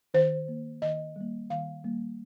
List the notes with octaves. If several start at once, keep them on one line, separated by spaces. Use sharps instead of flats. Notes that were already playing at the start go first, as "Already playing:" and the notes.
D#3 C5
A#3
D#3 D#5
G3 A#3
D#3 F5
G3 A#3